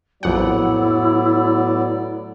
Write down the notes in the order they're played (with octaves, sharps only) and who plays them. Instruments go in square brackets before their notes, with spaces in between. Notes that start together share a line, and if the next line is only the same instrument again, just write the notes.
[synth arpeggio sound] A#1 F2 F#5 [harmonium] A2 B3 D5 [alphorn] F#3 [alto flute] E4